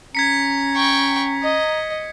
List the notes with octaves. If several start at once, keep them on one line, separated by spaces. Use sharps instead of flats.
C#4 A#5 G#6 B6 C#7
G5 C#6
D#5